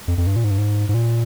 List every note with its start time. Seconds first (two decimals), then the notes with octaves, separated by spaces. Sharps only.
0.08 F2
0.18 F2
0.27 G2
0.36 A#2
0.44 G#2
0.51 G2
0.58 G#2
0.89 G#2
0.94 A#2